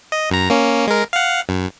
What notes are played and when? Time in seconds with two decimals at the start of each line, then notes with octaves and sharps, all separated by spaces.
0.12 D#5
0.31 F#2 A#5
0.50 A#3 C#4
0.87 G#3 A#4
1.13 F5 F#5
1.49 F#2